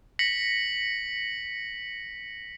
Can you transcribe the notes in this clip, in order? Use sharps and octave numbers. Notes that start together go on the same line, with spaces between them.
A#6 B6 C#7 F#7